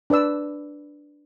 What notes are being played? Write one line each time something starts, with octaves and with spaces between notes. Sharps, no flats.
D4 B4 D5 E6